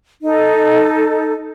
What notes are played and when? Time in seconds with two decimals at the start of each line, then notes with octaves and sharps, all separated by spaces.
0.23 D#4 A4